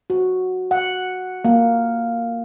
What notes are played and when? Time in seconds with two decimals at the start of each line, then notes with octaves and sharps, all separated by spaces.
0.10 F#4
0.71 F#5
1.45 A#3